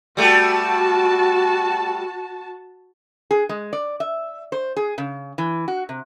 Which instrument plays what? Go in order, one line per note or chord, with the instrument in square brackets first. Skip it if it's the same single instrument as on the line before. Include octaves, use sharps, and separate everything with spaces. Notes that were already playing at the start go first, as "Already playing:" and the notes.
[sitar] G3 A3 [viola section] F#4 A5
[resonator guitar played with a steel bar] G#4
G#3
D5
E5
C5
G#4
C#3
E3
F#4
C3